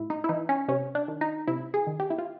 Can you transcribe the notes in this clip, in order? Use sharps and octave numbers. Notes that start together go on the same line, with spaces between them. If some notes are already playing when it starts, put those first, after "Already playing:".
Already playing: A2 E4
D#4
E4
E3 D#4
C#4
C3 C#4
D4
D#3
D#4
C3 E4
G#4
D#3
G4
E4
F4